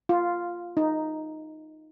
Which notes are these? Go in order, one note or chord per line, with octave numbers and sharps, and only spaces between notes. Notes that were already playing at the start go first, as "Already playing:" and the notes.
F4
D#4